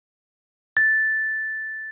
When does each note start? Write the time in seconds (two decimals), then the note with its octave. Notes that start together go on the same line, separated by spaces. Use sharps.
0.77 A6